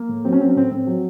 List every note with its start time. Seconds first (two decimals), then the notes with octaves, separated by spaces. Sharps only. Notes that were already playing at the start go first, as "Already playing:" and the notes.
Already playing: A#3
0.09 A2
0.25 F#3 C4
0.33 C#4
0.41 F#3 C4
0.49 C#4
0.56 A2 C4
0.71 A2 C4
0.87 F#3